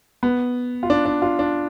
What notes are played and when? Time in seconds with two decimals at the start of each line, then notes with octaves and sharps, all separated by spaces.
0.23 B3
0.83 F4
0.90 D4
1.06 D4
1.22 F4
1.39 D4